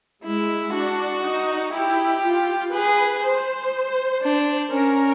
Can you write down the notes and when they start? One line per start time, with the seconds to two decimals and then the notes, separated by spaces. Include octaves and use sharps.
0.24 G#3 E4
0.73 D4 F#4
1.23 D#4
1.73 E4 G4
2.23 F4
2.73 G#4 B4
3.23 C5
4.22 D4
4.72 C#4 A#4